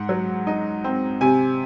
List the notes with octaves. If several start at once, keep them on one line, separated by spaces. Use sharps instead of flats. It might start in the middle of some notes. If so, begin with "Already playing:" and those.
Already playing: G#2 F#5
F#3
D#4
C4
C3 G#5